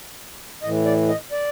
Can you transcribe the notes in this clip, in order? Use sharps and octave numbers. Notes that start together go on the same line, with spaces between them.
A2 E3 D#5
D5
D#5
D5